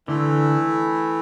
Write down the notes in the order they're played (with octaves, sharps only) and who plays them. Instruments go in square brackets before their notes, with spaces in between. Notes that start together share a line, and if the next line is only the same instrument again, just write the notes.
[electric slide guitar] D3 [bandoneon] E3 A3 E4